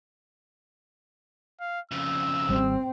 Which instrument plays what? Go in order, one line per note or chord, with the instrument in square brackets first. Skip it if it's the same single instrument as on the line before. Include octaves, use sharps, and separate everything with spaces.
[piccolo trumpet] F5
[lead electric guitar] F2 C#3 [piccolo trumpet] E6
[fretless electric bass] G#1 G3 [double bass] C4